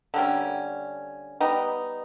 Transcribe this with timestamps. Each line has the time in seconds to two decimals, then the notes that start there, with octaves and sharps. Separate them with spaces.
0.14 D3 G3 A#3 C#4
1.40 G3 B3 D#4